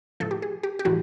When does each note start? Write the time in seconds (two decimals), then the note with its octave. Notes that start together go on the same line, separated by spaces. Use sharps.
0.20 A2 F3 A4
0.31 G4
0.42 G#4
0.63 G4
0.79 G4
0.85 A2 E3 G3 F#4